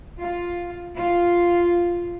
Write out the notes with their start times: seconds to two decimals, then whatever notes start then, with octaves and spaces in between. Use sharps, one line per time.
0.19 F4
0.96 F4